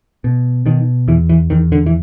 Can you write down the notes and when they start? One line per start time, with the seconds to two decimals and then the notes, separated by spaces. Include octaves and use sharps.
0.24 B2
0.66 B2 D#3
1.08 E2 E3
1.29 E3
1.50 E2 D#3
1.72 D3
1.86 E3